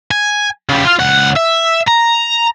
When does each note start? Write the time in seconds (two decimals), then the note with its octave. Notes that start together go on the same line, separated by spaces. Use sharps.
0.11 G#5
0.69 C#3 G3
0.85 F4 F5
1.00 C#2 F#5
1.36 E5
1.88 A#5